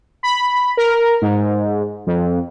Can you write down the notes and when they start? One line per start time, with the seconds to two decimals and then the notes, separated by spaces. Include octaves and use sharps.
0.23 B5
0.77 A#4
1.22 G#2
2.07 F2